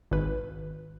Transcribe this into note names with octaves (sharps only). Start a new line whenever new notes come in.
G#1 B4